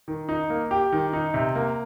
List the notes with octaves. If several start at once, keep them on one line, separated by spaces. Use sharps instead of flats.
D#3
D#4
A#3
G4
D#3
D#4
C3
A#3